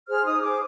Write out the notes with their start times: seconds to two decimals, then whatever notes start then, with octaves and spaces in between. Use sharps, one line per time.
0.08 G#4 C5 F6
0.25 D#4 D#6
0.43 G#4 C5 D6